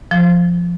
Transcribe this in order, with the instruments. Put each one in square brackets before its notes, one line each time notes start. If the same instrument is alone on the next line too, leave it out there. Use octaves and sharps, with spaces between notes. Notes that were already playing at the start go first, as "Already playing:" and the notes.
[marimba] F3